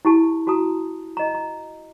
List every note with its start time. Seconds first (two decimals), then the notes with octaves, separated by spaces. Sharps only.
0.05 E4 G4 A5
0.47 F#4 A5 A#5 D#6
1.17 D#5 A#5
1.35 A#5